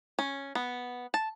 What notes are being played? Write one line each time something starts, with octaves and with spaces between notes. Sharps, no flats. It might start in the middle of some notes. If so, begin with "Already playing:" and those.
C#4
B3
A5